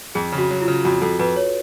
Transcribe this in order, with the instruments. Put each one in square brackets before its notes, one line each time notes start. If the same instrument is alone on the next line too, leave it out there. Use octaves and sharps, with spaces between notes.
[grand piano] F2 [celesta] G#4
[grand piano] C#3
[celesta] F#4
[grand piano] F#3
[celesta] F4
[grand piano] C#3
[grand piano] F2 [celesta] F#4
[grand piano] F2 [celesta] A4
[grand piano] F2 [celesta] B4
[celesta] C#5